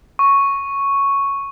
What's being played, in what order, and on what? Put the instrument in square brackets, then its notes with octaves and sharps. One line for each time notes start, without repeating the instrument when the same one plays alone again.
[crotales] C#6